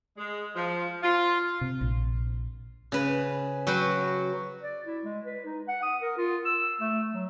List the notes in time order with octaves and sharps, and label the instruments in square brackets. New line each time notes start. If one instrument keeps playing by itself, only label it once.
[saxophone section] G#3
F3
F4
[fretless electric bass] C3
A#1
[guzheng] C#3 B4
F#3 F#4 B4 G5
[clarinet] D5
E4
G#3
B4
D#4
F#5
D#6
A#4
F4
E6
A3
F#3